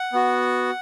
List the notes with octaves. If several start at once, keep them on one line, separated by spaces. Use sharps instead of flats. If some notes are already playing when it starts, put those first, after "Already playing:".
Already playing: F#5
B3 F#4